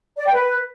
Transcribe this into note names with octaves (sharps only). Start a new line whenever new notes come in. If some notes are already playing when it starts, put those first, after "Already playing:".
D5
G5
B4